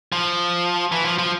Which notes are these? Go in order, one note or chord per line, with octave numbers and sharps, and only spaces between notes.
F3
E3
F3
F3